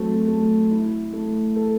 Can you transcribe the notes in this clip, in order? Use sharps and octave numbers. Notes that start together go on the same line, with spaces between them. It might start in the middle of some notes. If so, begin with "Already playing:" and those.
Already playing: F#3 A3 C4
A3
E4
A3
A4